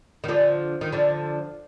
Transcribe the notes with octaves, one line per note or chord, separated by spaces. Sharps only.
D#3
D3 F3
D#3
D3 F3